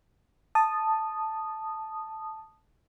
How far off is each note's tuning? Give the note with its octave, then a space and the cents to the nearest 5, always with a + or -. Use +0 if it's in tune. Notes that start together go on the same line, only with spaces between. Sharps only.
A5 +0 D#6 -10